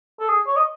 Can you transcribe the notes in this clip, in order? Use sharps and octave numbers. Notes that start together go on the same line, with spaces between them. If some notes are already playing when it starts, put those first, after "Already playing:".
A4
G#4
C#5
D#5